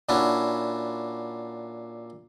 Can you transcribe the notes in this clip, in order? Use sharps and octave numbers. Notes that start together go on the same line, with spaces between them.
A#2 C#4 D4 E4 F#4